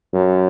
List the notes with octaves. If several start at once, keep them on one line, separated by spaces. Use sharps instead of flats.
F#2